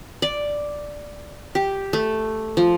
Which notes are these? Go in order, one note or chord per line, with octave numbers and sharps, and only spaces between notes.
D5
G4
A3
F3